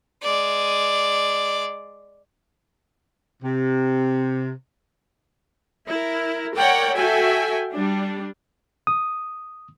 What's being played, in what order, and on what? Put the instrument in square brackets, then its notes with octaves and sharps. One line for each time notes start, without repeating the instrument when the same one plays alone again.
[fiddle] G#3 D5
[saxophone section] C3
[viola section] E4 A#4
A#4 C#5 D5 F#5 G5
F#4 A4 E5 G5 G#5
G3 D4
[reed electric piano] D#6